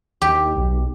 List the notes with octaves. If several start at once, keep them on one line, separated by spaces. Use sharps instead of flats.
D#2 G4
B1